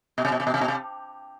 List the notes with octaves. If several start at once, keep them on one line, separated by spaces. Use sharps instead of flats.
B2
C3
B2
C3
B2
C3
B2
C3